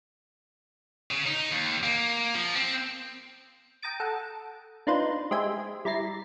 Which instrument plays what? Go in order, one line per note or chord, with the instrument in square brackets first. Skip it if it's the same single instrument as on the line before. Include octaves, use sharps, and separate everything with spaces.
[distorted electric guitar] C#3
D#4
D#2
A#3
F3
C4
[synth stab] G5 A#5 D#6 A6 D7
A4 F#5
D4 D#4 F4 B4 C5
G#3 G4 C5 E5 G#5
G3 E4 A#5 A6 C7